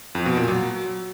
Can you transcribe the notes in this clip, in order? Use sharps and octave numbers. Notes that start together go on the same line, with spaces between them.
F2
B2
A#2
F#3